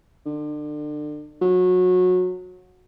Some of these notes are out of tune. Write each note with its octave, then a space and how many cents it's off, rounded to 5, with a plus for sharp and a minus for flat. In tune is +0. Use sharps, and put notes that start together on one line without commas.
D3 +30
F#3 -25